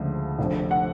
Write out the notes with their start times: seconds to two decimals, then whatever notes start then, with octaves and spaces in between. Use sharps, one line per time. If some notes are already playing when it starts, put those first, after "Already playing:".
Already playing: D2 C#3 F3 G#3
0.39 F1 F2 D3
0.71 F#5